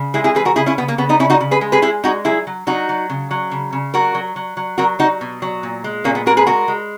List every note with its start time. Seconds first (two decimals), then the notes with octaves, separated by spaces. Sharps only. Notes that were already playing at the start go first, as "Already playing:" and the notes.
Already playing: C#3
0.14 G#3 E4 G#4
0.24 E4 G#4
0.35 E3 G#4 B4
0.45 F#4 A#4
0.56 C#3 E4 G#4
0.66 C#4 E4
0.78 C#3 B3
0.88 A#3
0.98 C#3 B3
1.09 B3 D#4
1.19 C#3 C#4 E4
1.30 D#4 F#4
1.41 C#3
1.51 G#4 B4
1.61 G#3
1.72 G#4 B4
1.82 G#3 E4 G#4
2.04 G#3 D#4 F#4
2.24 F#3 E4 G#4
2.47 F#3
2.67 F#3 D#4 F#4
2.89 F#3
3.10 C#3
3.31 F#3
3.51 C#3
3.73 C#3
3.94 F#3 F#4 A#4
4.15 F#3
4.36 F#3
4.57 F#3
4.78 F#3 F#4 A#4
4.99 F#3 D#4 F#4
5.21 B2
5.42 F#3
5.63 A#2
5.84 G#3
6.04 A#2 A#3 C#4
6.15 B3
6.26 G#3 F#4 A#4
6.37 G#4 B4
6.47 G#3 F#4 A#4
6.68 G#3